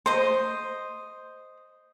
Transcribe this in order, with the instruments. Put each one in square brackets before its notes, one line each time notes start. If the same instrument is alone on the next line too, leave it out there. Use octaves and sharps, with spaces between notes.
[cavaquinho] C5 D#5